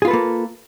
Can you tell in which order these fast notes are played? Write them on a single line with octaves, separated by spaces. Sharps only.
G#4 F4 B4 A4 A#3